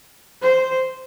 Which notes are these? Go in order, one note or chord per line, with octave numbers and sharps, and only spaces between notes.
C5